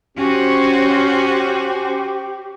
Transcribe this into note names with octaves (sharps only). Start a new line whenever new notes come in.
C#4 F#4 G4 C5